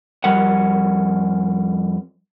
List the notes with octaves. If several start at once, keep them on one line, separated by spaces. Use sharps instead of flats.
F2 G3 A#4 F#5